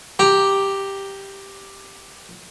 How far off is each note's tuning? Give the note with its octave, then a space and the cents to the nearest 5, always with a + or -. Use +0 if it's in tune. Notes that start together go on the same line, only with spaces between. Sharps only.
G4 +0 A#5 +0